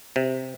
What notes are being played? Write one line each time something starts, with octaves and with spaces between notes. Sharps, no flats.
C3